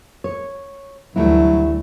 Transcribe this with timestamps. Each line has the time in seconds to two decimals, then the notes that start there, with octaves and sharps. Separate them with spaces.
0.24 C#5
1.16 D2 E3 F#3 G3 A3 E4